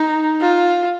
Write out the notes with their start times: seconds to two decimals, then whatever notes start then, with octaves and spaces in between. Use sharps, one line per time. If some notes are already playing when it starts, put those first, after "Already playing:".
Already playing: D#4
0.41 F4